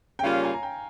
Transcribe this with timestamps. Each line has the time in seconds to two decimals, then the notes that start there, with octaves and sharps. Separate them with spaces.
0.19 G5
0.23 C#3 G3 A#3 C#4 F4 F5
0.34 C#5
0.44 G#5
0.53 A#5
0.63 G5